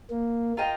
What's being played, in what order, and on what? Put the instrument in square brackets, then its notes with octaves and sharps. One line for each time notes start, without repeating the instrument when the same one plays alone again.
[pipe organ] A#3
[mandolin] F4 A#4 D#5 G5